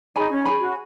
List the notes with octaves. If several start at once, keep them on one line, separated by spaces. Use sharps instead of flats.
D#4 G#4 C#5 G#5 B5
C#4
G#4 C#5 G#5 B5
F#4